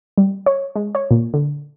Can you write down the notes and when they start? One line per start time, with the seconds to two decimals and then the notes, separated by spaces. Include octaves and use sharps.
0.18 G3
0.46 C#5
0.76 G#3
0.95 C#5
1.11 A#2
1.34 D3